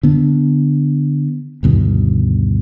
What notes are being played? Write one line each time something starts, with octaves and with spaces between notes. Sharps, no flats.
D3 B3
D2 G2 B2 D#3